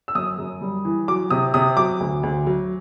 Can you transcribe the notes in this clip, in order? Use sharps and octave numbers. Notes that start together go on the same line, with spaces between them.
E6
F#2 D#6
F#2
G3
E3
F#3 D6
C3 D#6
C3 D#6
F#3 D6
D2
D2
F#3